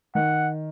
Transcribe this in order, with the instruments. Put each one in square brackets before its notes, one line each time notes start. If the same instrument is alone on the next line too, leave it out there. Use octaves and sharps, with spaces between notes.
[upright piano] D#3 [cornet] F#5